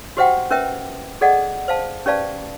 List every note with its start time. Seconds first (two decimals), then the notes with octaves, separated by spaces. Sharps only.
0.17 F#4 G4 C5 E5 F#5 G5
0.51 C#4 A#4 B4 E5 G5
1.21 G#4 A4 D5 D#5 F#5
1.68 C5 F5 A5
2.06 C#4 G4 B4 D5 F5 A5